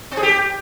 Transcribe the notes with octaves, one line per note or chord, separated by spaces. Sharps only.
C4
G#4
G4